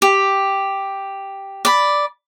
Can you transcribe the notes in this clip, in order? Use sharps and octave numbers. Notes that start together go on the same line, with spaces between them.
G4
D5 B5